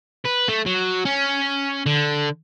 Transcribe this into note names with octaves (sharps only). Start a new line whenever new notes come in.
B4
A3
F#3
C#4
D3